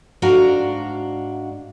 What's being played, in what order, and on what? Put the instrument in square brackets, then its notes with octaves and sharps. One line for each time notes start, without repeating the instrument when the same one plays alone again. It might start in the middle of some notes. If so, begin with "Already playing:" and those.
[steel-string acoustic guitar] G#2 D4 F#4 F5 A#5